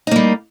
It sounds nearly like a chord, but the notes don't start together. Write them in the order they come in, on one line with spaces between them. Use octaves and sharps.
D#4 A#3 G3